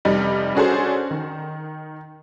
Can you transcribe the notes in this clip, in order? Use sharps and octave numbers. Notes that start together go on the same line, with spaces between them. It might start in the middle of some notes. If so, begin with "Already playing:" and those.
F1 G3 D#4
C#4 D4 F#4 G#4 A4 C5
D#3